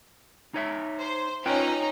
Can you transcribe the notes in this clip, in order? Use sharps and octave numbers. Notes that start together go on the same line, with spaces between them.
D#4 C#5 E5
C5
C#4 D#4 F4 B4 G5 A#5